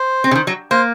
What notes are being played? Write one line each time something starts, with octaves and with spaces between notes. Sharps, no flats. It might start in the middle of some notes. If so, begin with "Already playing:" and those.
Already playing: C5
C4
C#3
D#3
F#3
A#3 C5